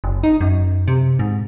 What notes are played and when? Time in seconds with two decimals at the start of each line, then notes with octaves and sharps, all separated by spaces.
0.04 F#1
0.23 D#4
0.41 F#2
0.88 C3
1.19 G#2